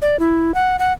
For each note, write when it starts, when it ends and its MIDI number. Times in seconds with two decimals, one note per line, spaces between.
0.02 0.19 74
0.19 0.54 64
0.54 0.77 78
0.79 0.93 78